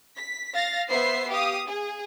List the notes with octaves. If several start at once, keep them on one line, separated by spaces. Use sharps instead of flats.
B6
F5 A6 A#6
B3 C5 E5 C7
G4 F5 D#6
G#4